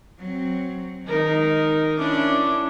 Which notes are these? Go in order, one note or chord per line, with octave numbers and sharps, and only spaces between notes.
F#3 C4
D#3 G#3 D#4 A#4
C#4 D4 E4 D6